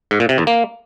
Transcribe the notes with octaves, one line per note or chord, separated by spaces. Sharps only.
G#2
A#2
C3
E2
A#3